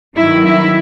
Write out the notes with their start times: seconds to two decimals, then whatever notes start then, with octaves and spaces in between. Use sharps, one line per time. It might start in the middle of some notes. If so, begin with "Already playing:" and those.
0.15 G2 D#3 F#3 E4
0.44 E4